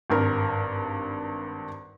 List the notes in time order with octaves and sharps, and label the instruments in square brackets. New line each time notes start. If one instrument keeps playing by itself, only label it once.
[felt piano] G#1 G2 A#4